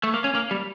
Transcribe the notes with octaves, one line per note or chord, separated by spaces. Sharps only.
A3
A#3
C#4
A#3
G3